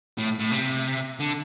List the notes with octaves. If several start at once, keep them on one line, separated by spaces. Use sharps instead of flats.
A2
A2
C3
D3